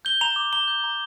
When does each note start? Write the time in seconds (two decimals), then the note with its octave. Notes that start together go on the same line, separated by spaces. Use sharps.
0.05 G6 G7
0.21 A#5 F7
0.36 D6
0.53 A#5 G7
0.68 G6
0.84 A#5